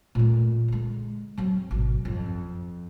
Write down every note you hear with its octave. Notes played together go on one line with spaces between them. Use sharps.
A#2 A3
D3 G#3
F#3 C4
G#1 B2
F2